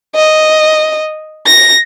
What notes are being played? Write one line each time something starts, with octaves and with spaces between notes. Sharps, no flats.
D#5
A#6